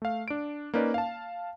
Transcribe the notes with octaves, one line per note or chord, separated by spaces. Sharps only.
A3 F5
D4 D7
A#3 C#4 D#4 B4 D5
F5 A5